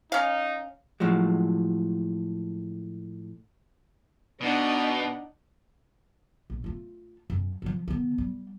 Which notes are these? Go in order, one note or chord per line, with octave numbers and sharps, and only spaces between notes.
C#4 D#4 F5
A2 F3 F#3 G#3
B2 D4 D#4 F#5
A#1
A3 F4
F#2
D2 F3
D#3 B3
G3